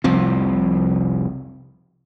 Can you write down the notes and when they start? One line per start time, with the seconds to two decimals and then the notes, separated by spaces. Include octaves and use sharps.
0.04 F1 C2 F3 C4